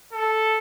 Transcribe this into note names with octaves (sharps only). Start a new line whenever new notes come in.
A4